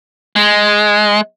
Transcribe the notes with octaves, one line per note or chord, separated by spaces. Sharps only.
G#3